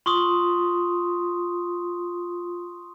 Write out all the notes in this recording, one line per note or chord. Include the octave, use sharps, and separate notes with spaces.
F4 C6 C#6 D#6